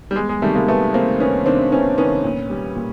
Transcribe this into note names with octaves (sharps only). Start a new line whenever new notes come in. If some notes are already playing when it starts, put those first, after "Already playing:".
G3
E2 G#3
G#3
C3 D#3 G3 A3
G#3 A#3
E2 A3 B3
C3 D#3 A#3 C4
E2 B3 C#4
C3 D#3 C4 D4
E2 B3 C#4
C3 D#3 B3 C#4
A#2
G3
A#2